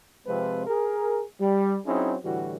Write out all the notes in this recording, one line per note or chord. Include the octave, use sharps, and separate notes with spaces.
C3 F3 G#3 C4 F4 B4
G#4 A#4
G3
F#3 C4 C#4 D#4 E4 G#4
A2 D3 E3 G3 F#4